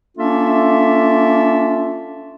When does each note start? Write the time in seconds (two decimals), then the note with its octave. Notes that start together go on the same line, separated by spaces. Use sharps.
0.18 A#3 C#4 D4 F4 A4 E5